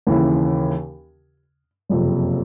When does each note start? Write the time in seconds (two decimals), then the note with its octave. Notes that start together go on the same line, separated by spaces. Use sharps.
0.07 D#2 C#3 E3
1.89 F#1 F2 C3